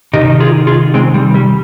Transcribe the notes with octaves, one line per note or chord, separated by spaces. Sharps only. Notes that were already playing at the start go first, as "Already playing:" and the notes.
C3 D#3 D#4 G4
F4 G#4
F4 G#4
G#3 C4
G3
G3